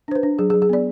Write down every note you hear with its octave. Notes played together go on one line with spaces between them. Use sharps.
D4 C5
B4
D4
F#3 G#4
G#4
F#3
G#4
B3 D5